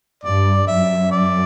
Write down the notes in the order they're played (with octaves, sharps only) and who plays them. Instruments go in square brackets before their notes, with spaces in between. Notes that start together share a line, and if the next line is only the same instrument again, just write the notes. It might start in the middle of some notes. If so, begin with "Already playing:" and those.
[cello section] G2 [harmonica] D5
[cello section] F#2 [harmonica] E5
[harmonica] D5